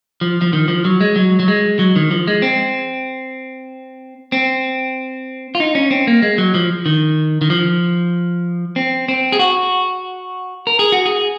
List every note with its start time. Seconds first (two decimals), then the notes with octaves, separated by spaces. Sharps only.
0.21 F3
0.42 F3
0.53 D#3
0.68 F3
0.85 F#3
1.01 G#3
1.16 F#3
1.40 F#3
1.48 G#3
1.79 F#3
1.96 D#3
2.11 F3
2.27 G#3
2.42 C4
4.32 C4
5.55 F4
5.60 D#4
5.75 C#4
5.91 C4
6.07 A#3
6.22 G#3
6.38 F#3
6.54 F3
6.86 D#3
7.41 D#3
7.50 F3
8.76 C4
9.08 C4
9.32 G#4
9.39 F#4
10.67 A#4
10.79 G#4
10.92 F#4
11.06 G#4